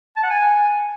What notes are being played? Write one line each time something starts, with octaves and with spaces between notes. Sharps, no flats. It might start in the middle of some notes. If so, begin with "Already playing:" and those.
A5
F#5
G#5